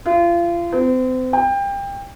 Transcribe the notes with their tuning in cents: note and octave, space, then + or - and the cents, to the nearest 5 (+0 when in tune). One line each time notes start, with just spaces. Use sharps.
F4 -30
C4 -35
G5 +25